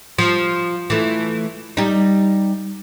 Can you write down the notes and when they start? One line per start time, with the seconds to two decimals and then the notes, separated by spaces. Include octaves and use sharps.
0.18 F3
0.90 E3 A3
1.77 G3 D#4